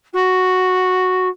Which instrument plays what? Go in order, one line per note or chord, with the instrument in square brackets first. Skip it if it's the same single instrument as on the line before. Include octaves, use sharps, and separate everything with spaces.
[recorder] F#4